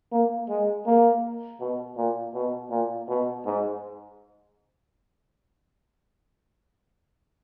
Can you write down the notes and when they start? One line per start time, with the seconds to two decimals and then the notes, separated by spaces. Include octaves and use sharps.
0.12 A#3
0.49 G#3
0.86 A#3
1.60 B2
1.97 A#2
2.34 B2
2.71 A#2
3.09 B2
3.46 G#2